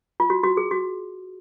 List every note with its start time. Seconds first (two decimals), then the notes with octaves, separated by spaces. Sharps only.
0.20 F4
0.30 F#4
0.43 F#4
0.57 G#4
0.71 F#4